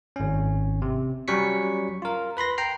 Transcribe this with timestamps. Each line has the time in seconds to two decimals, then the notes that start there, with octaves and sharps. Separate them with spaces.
0.16 G#1 C#4
0.82 C3
1.28 F#3 G3 C#4 C#6 B6 C#7
2.02 F4 A#4
2.37 B4 B5 C6 A#6
2.58 G5 A#5 C7